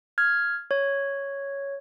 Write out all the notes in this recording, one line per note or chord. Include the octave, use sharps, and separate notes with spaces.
F6 G#6
C#5